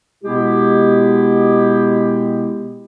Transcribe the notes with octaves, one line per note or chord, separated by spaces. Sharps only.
B2 G#3 B3 E4 G4